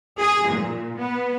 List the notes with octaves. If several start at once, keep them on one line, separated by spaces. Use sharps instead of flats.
G#4
A#2
B3